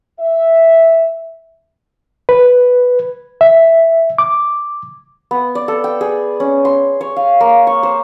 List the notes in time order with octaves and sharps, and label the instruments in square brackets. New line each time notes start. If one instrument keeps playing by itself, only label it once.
[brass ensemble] E5
[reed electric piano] B4
E5
D6
[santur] B3
D5
A4
G5
G#4
C#4
C6
C#5
F5
A#3
C#6
C5